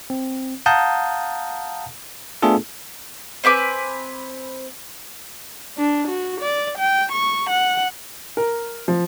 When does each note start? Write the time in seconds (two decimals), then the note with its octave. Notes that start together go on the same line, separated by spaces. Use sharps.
0.10 C4
0.66 F5 F#5 A5 A#5 D#6 G6
2.42 A3 B3 D4 F4 G#4 A4
3.44 C4 B4 G#5 D6
5.77 D4
6.08 F#4
6.41 D5
6.78 G5
7.12 C#6
7.50 F#5
8.37 A#4
8.88 F3